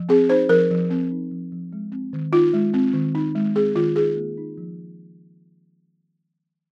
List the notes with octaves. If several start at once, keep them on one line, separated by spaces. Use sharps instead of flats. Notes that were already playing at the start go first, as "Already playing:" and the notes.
Already playing: F3
C4 G#4
D#4 C5
F3 A#4
F3
C4
D#4
F3
F3
G#3
C4
D#3
D#4 F4
G#3
C4
D#3
D#4
G#3
C4 G#4
D#3 F4
D#4 G#4
A#3
D#4
F3